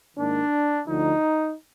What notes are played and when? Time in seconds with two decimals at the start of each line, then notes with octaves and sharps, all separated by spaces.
0.17 G#2 D#3 A#3 D4
0.88 D2 D3 F3 D#4